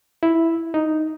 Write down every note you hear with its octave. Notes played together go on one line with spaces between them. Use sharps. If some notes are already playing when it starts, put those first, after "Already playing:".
E4
D#4